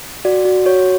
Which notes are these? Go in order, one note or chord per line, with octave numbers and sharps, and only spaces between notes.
F#4 D5
F#4
F#4 C#5